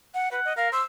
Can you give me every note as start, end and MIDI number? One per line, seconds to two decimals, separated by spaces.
0.14 0.29 78
0.32 0.40 71
0.32 0.52 78
0.45 0.53 75
0.57 0.68 70
0.57 0.68 77
0.72 0.81 72
0.72 0.82 88